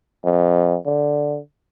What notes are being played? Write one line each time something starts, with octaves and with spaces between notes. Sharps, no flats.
F2
D3